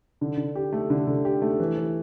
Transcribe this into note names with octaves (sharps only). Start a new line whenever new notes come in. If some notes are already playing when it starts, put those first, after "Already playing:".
D3
D3
G4
A3
D3
D3
G4
A3
E3
E3